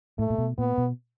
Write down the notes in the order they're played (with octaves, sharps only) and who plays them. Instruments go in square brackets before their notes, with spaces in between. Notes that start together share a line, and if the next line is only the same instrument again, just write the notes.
[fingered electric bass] A2 [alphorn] A3
[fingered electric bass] A#2
B2
[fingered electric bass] A#2 [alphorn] B3
[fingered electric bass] B2